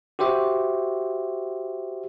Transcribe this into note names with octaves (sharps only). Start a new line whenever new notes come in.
F#4 G4 C5 E5